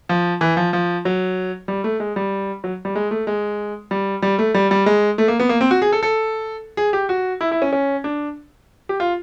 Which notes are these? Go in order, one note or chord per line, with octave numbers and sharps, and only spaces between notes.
F3
E3
F3
F3
F#3
G3
A3
G#3
G3
F#3
G3
G#3
A3
G#3
G3
G3
A3
G3
G3
G#3
A3
A#3
B3
A#3
C4
F#4
G#4
A4
A4
G#4
G4
F#4
E4
E4
C#4
C#4
D4
G4
F4